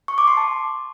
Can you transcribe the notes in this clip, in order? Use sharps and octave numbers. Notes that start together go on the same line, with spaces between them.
C#6
D6
C6
A5